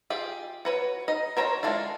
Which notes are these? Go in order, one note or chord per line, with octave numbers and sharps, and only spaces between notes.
F4 G4 G#4
F#4 B4 C#5
D#4 D#5
A#4 C5 C#5 A5 A#5
G#3 A3 D4 E4 F4